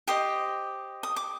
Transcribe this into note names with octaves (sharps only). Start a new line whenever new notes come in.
G4 C5 D#5 D#6
D#6
D6